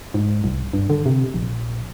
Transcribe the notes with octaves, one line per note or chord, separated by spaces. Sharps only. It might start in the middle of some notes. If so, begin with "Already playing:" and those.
G#2
C2
G2
D3
C3
A#1